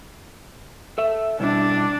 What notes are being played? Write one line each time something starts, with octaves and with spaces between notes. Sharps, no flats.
A4 E5
B2 G3 D4 E4